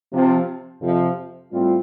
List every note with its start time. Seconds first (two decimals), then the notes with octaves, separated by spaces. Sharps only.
0.12 C3 F3 C4
0.81 F2 C3 F3
1.51 A2 G3 C4 F4